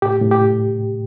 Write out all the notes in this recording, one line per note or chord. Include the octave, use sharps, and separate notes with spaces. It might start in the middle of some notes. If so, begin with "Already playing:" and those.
A2 G4
A2
G4
A2